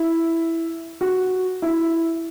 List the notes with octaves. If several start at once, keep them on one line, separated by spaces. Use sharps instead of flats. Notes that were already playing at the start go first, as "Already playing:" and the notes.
Already playing: E4
F#4
E4